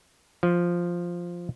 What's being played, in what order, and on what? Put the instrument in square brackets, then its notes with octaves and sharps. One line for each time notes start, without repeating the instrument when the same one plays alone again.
[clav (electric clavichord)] F3